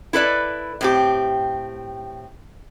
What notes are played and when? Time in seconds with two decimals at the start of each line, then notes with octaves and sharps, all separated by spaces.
0.13 E4 A4 B4 D5
0.81 A2 C4 G4